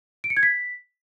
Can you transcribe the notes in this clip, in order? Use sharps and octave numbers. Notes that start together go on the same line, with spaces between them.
D7
C#7
G#6
B6